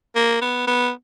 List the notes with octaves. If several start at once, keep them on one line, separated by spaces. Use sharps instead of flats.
A#3
B3
B3